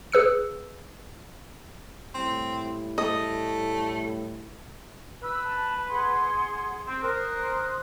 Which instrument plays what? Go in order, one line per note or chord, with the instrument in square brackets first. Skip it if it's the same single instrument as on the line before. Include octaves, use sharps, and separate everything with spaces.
[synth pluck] G#4 B4 E6 C#7
[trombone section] A2 G3 E4 [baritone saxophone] C4
[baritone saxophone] A3 [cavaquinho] D#5
[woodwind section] B4 [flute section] E6
[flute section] A5
G#4 F#5 C6
[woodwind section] C4
[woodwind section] A#4 [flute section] C5 D#6 F#6